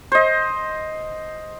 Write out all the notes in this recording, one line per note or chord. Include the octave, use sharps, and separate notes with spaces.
C5 D#5